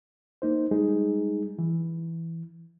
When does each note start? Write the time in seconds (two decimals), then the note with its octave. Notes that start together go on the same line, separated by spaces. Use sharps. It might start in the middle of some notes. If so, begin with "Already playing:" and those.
0.42 A#3 D#4 C5
0.71 G3 G#3 D#4 G#4
1.59 E3